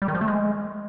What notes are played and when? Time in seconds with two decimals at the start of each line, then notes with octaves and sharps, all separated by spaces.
0.02 G3
0.08 D#3
0.15 F3
0.21 A3
0.28 G#3